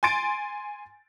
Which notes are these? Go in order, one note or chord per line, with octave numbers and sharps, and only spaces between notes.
G#5 C6 A6 D7